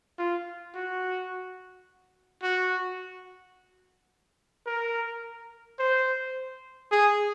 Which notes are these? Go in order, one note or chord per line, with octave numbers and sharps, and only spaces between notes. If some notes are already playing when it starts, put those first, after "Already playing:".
F4
F#4
F#4
A#4
C5
G#4